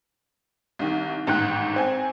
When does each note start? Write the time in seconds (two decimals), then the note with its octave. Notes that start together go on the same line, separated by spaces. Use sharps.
0.79 C2 D#3
1.27 A1 G#2 D#3 G5 F#6
1.76 C4 G#5